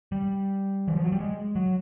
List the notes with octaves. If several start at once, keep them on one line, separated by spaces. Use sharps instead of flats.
G3
E3
F3
F#3
G3
G#3
F#3